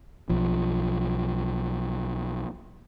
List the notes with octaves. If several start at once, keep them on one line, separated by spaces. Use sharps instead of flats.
B1 F3